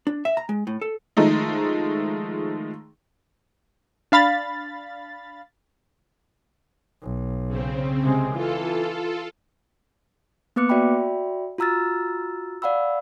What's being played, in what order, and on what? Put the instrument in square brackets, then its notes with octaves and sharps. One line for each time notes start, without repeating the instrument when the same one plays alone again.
[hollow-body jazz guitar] D4
E5
A#5
G#3
A2
A4
[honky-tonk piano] D#3 F3 G#3 A3 D#4
[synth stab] D4 F5 B5 A6
[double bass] B1
[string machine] C#3 C4
[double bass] C3 G#3
[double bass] E3 [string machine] F4 A4
[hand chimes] A#3 B3 B4 D6 F#6 C#7
F#4 D5 E5 G5 B5
F4 F#4 A#5 E6 F6 A6
D5 F5 F#5 B5 E6